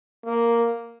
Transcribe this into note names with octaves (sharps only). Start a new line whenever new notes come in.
A#3